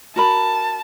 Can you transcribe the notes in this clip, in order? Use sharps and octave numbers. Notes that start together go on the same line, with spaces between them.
F#4 A#4 A5 B5